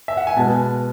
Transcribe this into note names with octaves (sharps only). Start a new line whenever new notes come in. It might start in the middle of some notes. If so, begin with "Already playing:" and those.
E5
F#5
G#5
B2 G#3 B3 A5